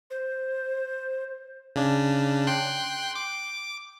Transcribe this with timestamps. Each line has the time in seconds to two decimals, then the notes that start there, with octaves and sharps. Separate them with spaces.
0.11 C5
1.76 C#3 D4
2.47 G5 C6 F#6
3.15 D6